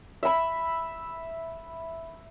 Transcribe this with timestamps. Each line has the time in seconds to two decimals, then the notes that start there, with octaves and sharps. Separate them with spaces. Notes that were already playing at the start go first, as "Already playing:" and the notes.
0.23 E5 B5